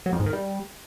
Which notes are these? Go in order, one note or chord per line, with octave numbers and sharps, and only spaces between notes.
F#3
F2
G#2
D#3
G3